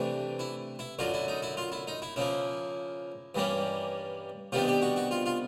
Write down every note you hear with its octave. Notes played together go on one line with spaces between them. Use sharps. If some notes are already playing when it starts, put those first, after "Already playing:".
Already playing: C3 E3 A3 D4
E4
E4
F#2 D3 F#3 F4
E4
D#4
E4
F4
E4
D#4
E4
C#3 F3 A#3 E4
G2 E3 G3 A#3 C#4
C3 D#3 G3 B3 D4 F4
G4
F#4
F#4
F4
F4